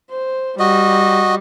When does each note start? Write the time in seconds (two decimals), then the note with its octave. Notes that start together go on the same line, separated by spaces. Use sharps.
0.11 C5
0.59 G3 F#4 D#5